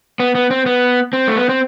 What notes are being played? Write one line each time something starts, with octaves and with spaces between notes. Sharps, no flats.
B3
B3
C4
B3
C4
A3
B3
C4